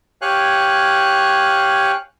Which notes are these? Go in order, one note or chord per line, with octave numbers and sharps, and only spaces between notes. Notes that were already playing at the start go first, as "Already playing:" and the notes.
G4 C#5 F5 G#5 F#6